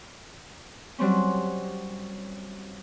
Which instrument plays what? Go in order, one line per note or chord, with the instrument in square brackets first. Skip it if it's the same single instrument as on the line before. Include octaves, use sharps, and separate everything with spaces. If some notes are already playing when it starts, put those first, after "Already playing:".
[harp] F#3 G3 C4 C#4